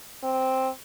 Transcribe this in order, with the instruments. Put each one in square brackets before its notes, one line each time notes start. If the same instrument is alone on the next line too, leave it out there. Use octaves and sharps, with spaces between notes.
[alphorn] C4